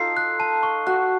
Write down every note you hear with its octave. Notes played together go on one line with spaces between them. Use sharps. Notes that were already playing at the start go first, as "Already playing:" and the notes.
Already playing: D#4 F4 A4 C7
F#6
A5
C#6
F#4 F#6